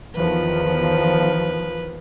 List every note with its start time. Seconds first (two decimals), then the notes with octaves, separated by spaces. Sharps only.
0.15 E2 D#3 F3 B4